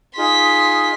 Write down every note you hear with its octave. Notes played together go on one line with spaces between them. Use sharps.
D#4 F4 G#4 C6 B6